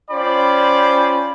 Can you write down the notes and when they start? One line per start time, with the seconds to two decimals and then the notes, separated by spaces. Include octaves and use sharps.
0.11 C#4 F4 C5 D5 G5 B5